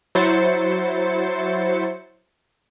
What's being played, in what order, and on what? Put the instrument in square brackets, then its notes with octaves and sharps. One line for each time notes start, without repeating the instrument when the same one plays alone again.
[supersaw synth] F#3 E4 C5 A6 C#7